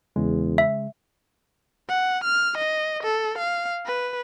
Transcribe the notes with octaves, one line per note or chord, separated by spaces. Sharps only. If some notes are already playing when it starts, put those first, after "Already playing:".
E2 C#3 G#3
E5
F#5
F6
D#5
A4
F5
B4